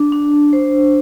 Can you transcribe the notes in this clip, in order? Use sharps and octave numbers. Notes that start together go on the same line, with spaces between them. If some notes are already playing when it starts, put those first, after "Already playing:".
Already playing: D4
D4
C5